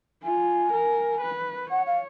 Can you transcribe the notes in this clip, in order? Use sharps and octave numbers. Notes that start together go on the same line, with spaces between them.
F4 G#5
A#4
B4
C#5 F#5
F5